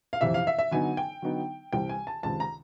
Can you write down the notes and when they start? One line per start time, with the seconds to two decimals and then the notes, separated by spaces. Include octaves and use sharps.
0.13 F5
0.21 F2 C3 E3 E5
0.34 F5
0.47 E5
0.58 E5
0.71 D3 F#3 B3 D#4 G#5
0.97 G5
1.22 D3 F#3 B3 D#4
1.73 C2 C3 E3 G5
1.89 G#5
2.07 A5
2.23 C#2 C3 D#3 A5
2.40 A#5